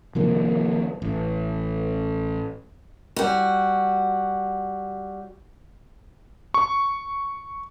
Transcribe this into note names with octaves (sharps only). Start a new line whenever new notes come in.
C3 D#3 F3 A#3
A1
G3 F#4
C#6